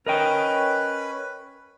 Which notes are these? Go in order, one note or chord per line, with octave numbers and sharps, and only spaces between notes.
C#4 A#4 B4 D#5 G5